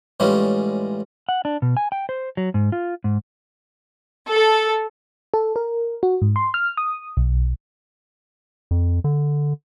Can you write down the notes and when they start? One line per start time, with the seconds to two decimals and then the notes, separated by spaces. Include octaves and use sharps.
0.20 A2 E3 G3 G#3 C#4 F4
1.29 F#5
1.45 D4
1.62 B2
1.77 G#5
1.92 G5
2.09 C5
2.37 F#3
2.54 G#2
2.72 F4
3.04 G#2
4.29 A4
5.34 A4
5.56 A#4
6.03 F#4
6.22 G#2
6.36 C6
6.54 F6
6.77 D#6
7.17 B1
8.71 F2
9.04 D3